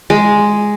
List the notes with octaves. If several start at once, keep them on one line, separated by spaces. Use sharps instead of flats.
G#3